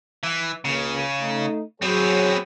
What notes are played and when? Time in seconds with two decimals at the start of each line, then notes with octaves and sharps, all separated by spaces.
0.23 E3
0.65 C#2 C#3 A#3
1.20 A3 D#4
1.82 F#3 B3 C4 G#4 C#5